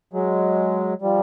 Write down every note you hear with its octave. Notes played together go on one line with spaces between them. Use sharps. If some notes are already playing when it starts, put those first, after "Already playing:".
F#3 G#3
F3 G3